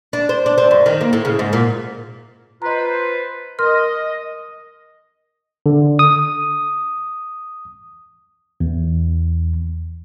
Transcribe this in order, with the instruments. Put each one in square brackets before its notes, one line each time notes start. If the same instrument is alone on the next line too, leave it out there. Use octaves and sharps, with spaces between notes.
[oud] D4
C5
D4
C4
F#2
D#3
A#3
A2
C#3
G#2
A#2
[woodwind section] F4 B4 C5 [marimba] D#5 A#5
[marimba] A#4 C6 F6 [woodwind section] D#5
[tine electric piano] D3
D#6
E2